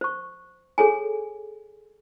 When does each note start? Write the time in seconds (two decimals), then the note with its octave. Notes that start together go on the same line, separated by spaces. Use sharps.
0.01 C5 C#6
0.78 G#4 A4 C#5 G#5